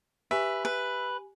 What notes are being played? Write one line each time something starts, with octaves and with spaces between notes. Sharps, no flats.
G4 B4 E5 G#5
B4